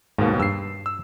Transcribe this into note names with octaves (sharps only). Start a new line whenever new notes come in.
D#2 G#2 B2 A#3
G2 E6 C7
E6